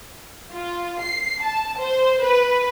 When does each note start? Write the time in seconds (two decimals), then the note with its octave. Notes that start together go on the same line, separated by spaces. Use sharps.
0.53 F4
1.01 C7
1.43 A5
1.79 C5
2.23 B4